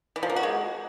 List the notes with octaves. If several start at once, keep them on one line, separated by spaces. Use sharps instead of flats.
E3
F3
A#3
F#4
G#3